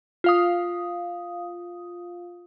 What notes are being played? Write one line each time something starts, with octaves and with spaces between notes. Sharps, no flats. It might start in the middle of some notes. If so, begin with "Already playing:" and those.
F4 F5 D#6